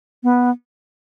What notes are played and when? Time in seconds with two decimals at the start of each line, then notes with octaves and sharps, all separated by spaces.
0.23 B3